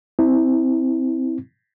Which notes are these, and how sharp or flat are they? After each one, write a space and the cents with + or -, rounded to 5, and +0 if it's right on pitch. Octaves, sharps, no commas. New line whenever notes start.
C4 -5 E4 -20